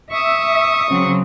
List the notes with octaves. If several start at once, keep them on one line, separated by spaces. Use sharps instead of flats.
E5 C#6 D#6
C#3 F#3 C4